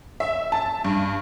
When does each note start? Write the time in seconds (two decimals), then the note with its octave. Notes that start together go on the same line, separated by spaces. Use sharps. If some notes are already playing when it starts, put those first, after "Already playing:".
0.20 E5
0.52 A5
0.85 G2